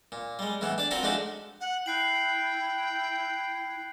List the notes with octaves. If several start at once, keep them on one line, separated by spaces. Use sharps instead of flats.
A#2
G3 G#3
A2 E3 B3
D4 D5
C4 F4 F#4 A#4 F#5 B5
F3 G#3 A3 D4 D#4 F#4
F#5
E4 G5 F#6 C7 F#7